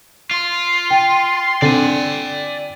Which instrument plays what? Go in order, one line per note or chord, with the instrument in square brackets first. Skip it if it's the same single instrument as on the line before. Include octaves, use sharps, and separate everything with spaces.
[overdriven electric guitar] F4 [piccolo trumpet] C6
[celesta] G5
[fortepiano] D3 C4 [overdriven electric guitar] D5 G#5